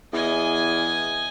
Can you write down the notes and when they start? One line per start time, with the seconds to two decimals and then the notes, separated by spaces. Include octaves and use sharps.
0.13 E2 D#5 G#5